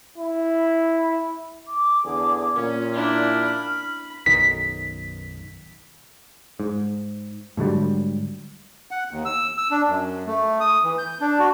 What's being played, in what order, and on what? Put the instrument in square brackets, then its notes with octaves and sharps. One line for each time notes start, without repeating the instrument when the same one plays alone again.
[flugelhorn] E4
[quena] D6
[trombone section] E2 D3 G#4
[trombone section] A#2 [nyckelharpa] C#4
[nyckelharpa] D4 E4 [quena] F6
[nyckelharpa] B5
[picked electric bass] B1 F#2 D#3 [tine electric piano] B6
[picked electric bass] G#2
G#2 D3 F#3 G3
[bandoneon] F#5
D#2
E6
E6
D4
F#2
A3
D#6
E3
G6
D4
F#4